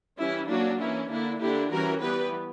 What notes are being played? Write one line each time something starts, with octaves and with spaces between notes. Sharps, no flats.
E3 G3 C#4 E4
F#3 A#3 C#4 D4 F#4
E3 A#3 C#4 E4
D3 A#3 D4 E4
D3 A#3 D4 E4 G4
E3 G3 C#4 F#4 A#4
E3 G3 B3 G4 B4